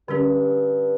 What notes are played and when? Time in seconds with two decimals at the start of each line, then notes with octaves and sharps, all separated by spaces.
0.08 G2 D3 G3 C#4 G4